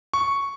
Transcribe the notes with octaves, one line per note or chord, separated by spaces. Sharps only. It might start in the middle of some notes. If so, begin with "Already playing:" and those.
C#6